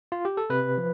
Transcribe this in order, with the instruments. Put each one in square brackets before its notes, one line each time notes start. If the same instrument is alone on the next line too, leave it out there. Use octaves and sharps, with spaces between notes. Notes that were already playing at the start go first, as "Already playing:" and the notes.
[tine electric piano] F4
G4
A4
C3 B4
F3